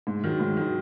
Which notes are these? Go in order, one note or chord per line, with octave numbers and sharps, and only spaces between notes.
G#2
D#3 F#3
G#2
D#3 F#3